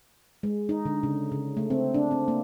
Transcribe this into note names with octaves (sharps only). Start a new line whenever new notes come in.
G#3
D#4
D3
C#3
C#3
A3
C4
D4
C4
A#3